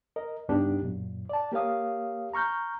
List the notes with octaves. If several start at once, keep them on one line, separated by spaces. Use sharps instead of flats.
A#4 D#5
C#2 G2 B3 D4 D#4 G4
F#2 A#2
D5 A5
A#3 G4 A#4 C#5 F5 D#6
A#5 C#6 F6 G6